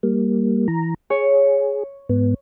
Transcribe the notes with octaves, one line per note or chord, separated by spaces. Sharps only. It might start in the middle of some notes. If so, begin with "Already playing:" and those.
G3 A#3
E3 A#5
G#4 C#5
G#2 B3